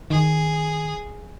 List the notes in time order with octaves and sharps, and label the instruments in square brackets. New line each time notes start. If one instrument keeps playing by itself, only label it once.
[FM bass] D#3 [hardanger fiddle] G#4